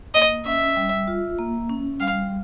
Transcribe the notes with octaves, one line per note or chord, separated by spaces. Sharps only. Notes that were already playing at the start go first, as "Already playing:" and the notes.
A#3 D#5
C#4 E5
G3
F4
A#3
C#4
G3 F5